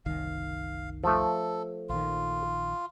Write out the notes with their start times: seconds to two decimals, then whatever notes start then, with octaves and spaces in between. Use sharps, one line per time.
0.06 F#1 C2 D#3 F5
1.04 F3 A3 A4
1.89 A#1 D#3 F4